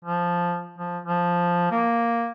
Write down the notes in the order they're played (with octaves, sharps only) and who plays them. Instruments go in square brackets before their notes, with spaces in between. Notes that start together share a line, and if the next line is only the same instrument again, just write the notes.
[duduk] F3
F3
F3
A#3